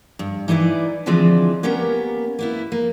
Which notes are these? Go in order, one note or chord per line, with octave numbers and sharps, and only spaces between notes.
G2
E3 D#4 E4 B4 D5
D3 E3 F3 G#3 C4 D4
A#3 B3 C#4 G4 A#4
A#3 B3 E4
A#3